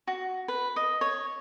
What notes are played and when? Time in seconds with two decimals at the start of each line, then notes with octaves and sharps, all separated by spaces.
0.07 F#4
0.48 B4
0.76 D#5
1.01 C#5